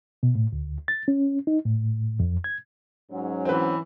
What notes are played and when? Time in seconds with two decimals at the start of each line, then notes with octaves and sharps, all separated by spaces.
0.23 B2
0.35 A2
0.52 D2
0.88 A6
1.08 C#4
1.47 D#4
1.65 A2
2.20 F2
2.44 G#6
3.11 G#2 F#3 C#4
3.45 E3 C4 B4